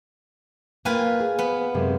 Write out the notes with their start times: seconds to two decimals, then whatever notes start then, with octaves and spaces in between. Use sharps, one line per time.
0.85 A#3 F4 B4 G5 G#5
1.20 G#4
1.39 B3
1.74 F#2 C3 G#3